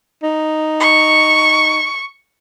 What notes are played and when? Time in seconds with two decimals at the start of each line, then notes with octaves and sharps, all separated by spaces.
0.23 D#4
0.80 C#6